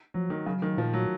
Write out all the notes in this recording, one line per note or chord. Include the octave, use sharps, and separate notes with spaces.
F3 F#3
D#3
C#3 F#3
D#3
A#2 F3
F#3